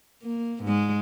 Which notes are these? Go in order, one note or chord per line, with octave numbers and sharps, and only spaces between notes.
A#3
G#2 G#3